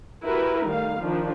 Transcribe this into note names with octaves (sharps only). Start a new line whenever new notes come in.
E4 F#4 G4 A#4 B4
D#3 G3 A3 F5
D#3 F3 D4